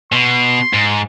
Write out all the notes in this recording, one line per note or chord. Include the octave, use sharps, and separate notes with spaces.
B2 C6
G#2